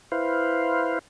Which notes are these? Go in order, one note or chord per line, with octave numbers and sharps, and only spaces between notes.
E4 B4 C5 F5